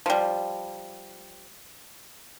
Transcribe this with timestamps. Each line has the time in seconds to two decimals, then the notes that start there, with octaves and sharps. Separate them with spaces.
0.06 F3 G3